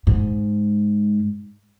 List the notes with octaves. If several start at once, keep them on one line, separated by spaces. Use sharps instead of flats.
G#2